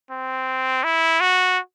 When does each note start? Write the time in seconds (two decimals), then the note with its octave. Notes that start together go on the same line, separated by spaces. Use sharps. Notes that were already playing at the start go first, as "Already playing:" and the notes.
0.11 C4
0.84 E4
1.20 F#4